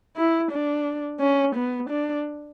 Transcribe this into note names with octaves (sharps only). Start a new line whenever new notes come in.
E4
D4
C#4
B3
D4